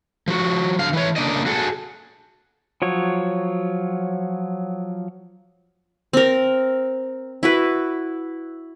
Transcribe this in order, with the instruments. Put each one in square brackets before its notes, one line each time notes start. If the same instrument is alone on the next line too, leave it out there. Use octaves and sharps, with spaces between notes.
[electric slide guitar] F3 F#4
D3 F5
E3 C#5
C#3 A#3 C4 D4 D5 D#5
F#4 G#4 A4
[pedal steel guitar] F3 F#3 C#5
[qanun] C4 A#4
E4 F#4 B4